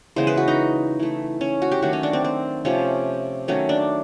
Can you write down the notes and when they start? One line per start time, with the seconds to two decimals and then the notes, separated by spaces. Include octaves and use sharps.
0.16 C#3 E3 G#3 B3 C5
0.27 B4
0.37 F#4
0.48 D#4
1.00 E3 A3
1.41 C#4
1.62 F#4
1.72 G4
1.82 D#3 F#3 A3 F#4
1.93 C#4
2.03 D4
2.13 C4
2.24 C4
2.65 C3 F3 A3 C#4
3.48 D#3 F#3 A3 C#4
3.69 D4